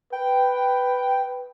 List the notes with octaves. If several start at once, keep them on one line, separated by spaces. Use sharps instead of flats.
B4 G5